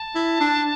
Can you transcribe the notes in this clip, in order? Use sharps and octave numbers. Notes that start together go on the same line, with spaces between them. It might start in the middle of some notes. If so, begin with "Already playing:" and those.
Already playing: A5
E4
D4